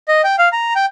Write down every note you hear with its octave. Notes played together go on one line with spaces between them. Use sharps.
D#5
G5
F5
A#5
G5